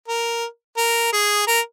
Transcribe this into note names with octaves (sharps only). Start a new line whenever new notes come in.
A#4
A#4
G#4
A#4